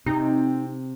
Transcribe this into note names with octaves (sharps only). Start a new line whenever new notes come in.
C3 C4 D#4